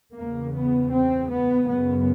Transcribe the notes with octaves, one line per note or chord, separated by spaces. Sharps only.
E2 C#3 A#3
B3
C4
B3
F#2 C#3 B3